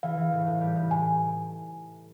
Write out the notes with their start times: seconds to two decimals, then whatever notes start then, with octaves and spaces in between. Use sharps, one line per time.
0.03 E3 F5
0.17 E3
0.32 A2
0.47 A2
0.61 G3
0.75 A2
0.91 G#5